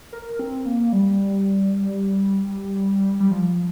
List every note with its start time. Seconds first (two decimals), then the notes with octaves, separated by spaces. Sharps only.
0.13 A#4
0.39 C4
0.66 A#3
0.93 G3
3.20 G3
3.31 F3